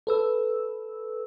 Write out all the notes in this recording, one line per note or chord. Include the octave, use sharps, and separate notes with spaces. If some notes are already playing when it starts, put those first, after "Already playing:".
A4 B4 E6